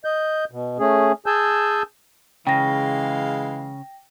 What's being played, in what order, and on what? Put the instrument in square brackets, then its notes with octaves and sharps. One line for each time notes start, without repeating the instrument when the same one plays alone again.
[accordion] D#5 G6
B2
A3 C#4 G#4
G#4 G#5 A5 E6 G6
[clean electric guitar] C#3 [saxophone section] E3 G#3 F5 [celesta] G5 A#6